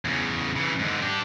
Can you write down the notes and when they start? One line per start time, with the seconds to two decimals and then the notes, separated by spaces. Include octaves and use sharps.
0.05 E2 C#3
0.56 C#3 E3
0.79 G#2 D3
1.02 D4 G4